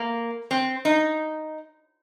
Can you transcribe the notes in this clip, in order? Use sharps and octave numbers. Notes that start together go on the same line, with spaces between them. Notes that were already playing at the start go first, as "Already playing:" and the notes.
Already playing: A#3
C4
D#4